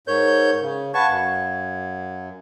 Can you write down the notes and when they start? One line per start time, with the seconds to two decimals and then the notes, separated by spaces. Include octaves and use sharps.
0.07 G#2 A#4 C#5 G6
0.62 C#3
0.94 B4 F5 F#5 A5 C#6 G#6
1.08 F#2